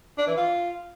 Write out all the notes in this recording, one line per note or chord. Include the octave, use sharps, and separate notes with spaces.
D4
E3
F4